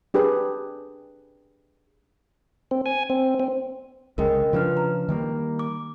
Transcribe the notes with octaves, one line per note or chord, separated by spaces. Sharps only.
D4 G4 G#4 B4
C4
G#5
C4
C4
C2 C#3 G#3 A#4 D#5 G5
C#3 F3 D4 F4 B4 F6
A#5
D#3 G3 A#3
D6